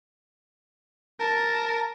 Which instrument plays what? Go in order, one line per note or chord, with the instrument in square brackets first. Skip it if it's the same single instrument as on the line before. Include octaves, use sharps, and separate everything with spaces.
[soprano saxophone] A#4 [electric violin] A5